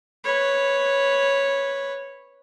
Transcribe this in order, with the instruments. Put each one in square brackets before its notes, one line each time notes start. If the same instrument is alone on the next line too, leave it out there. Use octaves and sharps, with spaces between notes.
[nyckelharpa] B4 C#5